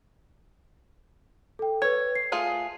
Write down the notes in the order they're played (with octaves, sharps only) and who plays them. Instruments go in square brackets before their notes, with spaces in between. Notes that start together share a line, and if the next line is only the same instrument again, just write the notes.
[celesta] A4 G5
[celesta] B4 G#6 [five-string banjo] C#5
[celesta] C7
[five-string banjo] A3 F4 G#4